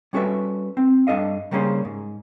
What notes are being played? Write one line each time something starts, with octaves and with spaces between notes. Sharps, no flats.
G3 C#4 F#4 A4 B4 E5
C4
G2 D4 A4 D#5 F5
C#3 G3 A#3 C#4 G#4 C5
G#2